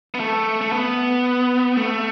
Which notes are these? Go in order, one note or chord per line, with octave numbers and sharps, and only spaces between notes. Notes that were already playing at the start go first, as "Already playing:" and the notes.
B3
A3
A3
B3
A3